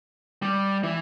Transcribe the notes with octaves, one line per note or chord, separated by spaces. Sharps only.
G3
E3